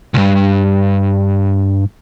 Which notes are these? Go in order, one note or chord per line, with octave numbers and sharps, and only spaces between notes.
C2 G2